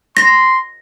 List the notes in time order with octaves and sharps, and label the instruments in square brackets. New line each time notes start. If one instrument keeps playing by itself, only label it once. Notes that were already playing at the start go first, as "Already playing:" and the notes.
[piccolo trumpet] C6 [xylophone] A#6